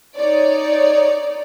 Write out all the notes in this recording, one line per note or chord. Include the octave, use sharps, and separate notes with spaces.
D#4 C#5 D5